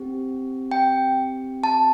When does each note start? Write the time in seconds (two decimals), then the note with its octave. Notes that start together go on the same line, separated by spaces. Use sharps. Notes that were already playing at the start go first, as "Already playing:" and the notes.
Already playing: C4 G4
0.71 G5
1.64 A5